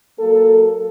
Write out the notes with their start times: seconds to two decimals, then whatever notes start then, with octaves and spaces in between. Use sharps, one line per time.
0.19 F#3 A#3 A4